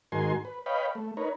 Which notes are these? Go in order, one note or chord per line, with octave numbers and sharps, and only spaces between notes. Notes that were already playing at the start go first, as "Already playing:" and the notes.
G#2 D#3 F#4 A#4 G#5 C6
B4
B4 C#5 D#5 F5 G5 B5
A3
D#4 A#4 B4 C#5